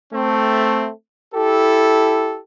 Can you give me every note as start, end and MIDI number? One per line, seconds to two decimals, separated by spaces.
0.13 0.89 57
0.13 0.89 60
1.34 2.39 64
1.34 2.39 67
1.34 2.39 69